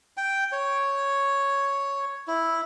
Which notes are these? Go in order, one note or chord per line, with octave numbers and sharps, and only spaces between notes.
G5
C#5
E4